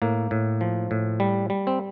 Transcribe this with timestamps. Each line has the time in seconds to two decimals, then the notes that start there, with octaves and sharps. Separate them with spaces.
0.02 A2 A#3
0.31 A2
0.61 F3
0.91 A2
1.20 G3
1.50 G3
1.67 C4